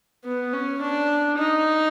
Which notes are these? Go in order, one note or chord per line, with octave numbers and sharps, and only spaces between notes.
B3
C#4
D4
D#4